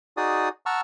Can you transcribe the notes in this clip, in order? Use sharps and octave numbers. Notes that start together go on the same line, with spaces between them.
D#4 F#4 G#4 D5 D#6
F#5 A5 A#5 C#6 E6 F6